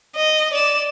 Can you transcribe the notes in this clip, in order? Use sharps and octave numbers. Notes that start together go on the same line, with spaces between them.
D#5
D5 E7